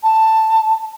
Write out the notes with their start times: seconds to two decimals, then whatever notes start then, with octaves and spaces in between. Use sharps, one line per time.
0.03 A5